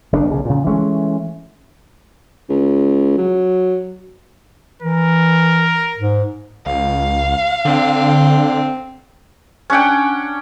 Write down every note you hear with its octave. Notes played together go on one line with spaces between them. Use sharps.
F#1 C#3 D4
B1 C#3
A#2 C#3
E3 G#3 A3 C#4
C#2
F#3
E3 A#4
G#2
C#2 F5
D3 C4
C#4 D4 F#5 G5